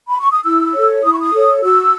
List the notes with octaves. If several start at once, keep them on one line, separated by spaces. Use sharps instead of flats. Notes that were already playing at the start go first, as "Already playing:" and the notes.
B5
C#6
D#6
E4 E6
A4 C#5
E4 D#6
C#6
D#6
A4 C#5
F#4 E6